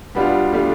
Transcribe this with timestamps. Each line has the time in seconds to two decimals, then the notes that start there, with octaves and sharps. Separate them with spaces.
0.15 B2 G3 B3 D4 F4
0.52 B2 G3 A3 D4 F4